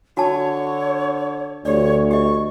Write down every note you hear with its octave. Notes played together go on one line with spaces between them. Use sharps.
D3 F#4 C#5 A5
D2 G4 C#5 D5
G4 D#5 C#6